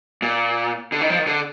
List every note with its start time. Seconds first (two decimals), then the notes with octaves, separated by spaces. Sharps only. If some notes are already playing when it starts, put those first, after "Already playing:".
0.22 A#2
0.92 D3
1.01 D#3
1.10 F3
1.19 D#3
1.27 D3